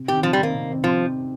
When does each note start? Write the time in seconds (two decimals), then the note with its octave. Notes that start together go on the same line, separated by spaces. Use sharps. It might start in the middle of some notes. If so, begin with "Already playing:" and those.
Already playing: C3
0.08 D#3 C4 D#4 G4
0.23 C3 F3
0.33 G3
0.38 D#3 A#3 C4 D#4
0.53 C3
0.68 D#3 C4 D#4
0.84 C3 F3